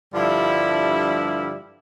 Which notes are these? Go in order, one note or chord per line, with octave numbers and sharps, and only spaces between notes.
G2 D3 F3 G3 E4